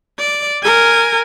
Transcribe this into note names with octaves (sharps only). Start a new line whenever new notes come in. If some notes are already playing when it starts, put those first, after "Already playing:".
D5
A#4 G#5